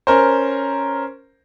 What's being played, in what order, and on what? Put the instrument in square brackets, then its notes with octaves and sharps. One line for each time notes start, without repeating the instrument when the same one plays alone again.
[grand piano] C#4 A#4 C5